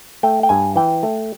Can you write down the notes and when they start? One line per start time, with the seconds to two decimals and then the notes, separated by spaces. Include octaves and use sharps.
0.23 A3 G5
0.43 G5
0.49 G2 G#5
0.76 E3 G5
1.03 A3